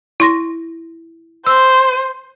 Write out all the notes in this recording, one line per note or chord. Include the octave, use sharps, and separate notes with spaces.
E4 C6 A#6
C5 E6